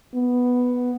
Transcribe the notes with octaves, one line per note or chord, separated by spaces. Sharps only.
B3